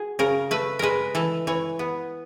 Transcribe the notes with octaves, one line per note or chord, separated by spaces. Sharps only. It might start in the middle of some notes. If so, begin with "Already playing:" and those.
Already playing: F#4 G#4
C#3 A#4
A3 B4
G#3 A#4 B4
E3 A4
E3 C#5
B3